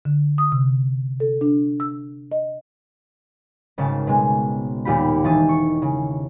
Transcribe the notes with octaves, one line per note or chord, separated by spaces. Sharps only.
D3
D#6
C3
A4
D4
E6
D#5
G#1 C#3 A5
B2 G#3
D#2 A#2 F4 G4 B5
E1 D#3 E3 A5 D#6
C#6
C#3